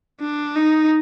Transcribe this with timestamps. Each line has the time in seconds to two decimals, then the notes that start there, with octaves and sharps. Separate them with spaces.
0.20 D4
0.56 D#4